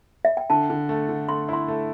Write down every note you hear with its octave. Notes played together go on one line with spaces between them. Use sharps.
E5
G5
D3 A5
D3
A3
D3
A3 C6
E4 C6
A3